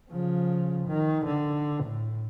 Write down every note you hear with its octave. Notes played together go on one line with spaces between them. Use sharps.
C#3 F3
D#3
D3
A2